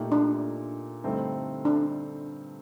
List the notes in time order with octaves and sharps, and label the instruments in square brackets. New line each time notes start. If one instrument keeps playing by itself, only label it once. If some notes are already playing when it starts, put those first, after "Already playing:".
Already playing: [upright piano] A#2 A3 D#4 G4
[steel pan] D4
[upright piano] G2 D3 A3 C4 D#4
[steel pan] D4